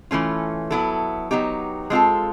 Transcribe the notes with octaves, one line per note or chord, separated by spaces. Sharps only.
E3 A3 C#4 F4
F#3 B3 E4 A4
F#3 B3 D#4 G4
G#3 C4 F4 A4